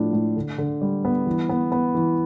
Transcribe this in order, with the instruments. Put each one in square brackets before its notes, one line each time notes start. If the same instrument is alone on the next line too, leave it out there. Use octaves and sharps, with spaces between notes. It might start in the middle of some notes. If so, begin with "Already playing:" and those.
Already playing: [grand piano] A2 F3 D4
A2
D3
D3
G3
B3
E3
B3
B3
E3